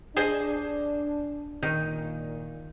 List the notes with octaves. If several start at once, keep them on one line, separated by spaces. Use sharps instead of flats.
D4 G#4 C5 D#5
A#2 D#3 D#4